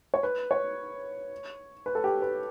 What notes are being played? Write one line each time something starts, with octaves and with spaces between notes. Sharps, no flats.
C#5
B4
C#5
B4
A4
G4
B4